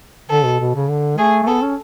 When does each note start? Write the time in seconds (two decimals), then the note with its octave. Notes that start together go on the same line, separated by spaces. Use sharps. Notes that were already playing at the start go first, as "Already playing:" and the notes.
0.30 D3 A4
0.45 B2
0.60 B2
0.75 C#3
0.89 D3
1.18 A3 G#4
1.43 A3
1.47 B3 A4
1.62 C#4